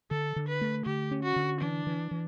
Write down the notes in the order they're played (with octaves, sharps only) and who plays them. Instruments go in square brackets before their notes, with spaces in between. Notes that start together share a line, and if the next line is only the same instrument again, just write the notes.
[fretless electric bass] D3 [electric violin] A4
[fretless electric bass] D3
[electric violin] B4
[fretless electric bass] A3
[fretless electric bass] D3 [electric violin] G4
[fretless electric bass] C#4
[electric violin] F#4
[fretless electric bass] D3
[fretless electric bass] E3 [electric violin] D4
[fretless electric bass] E3
E3